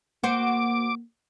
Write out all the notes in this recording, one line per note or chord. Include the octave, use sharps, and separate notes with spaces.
A#3 F#4 C5 D6